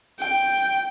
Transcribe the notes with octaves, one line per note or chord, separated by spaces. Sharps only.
G5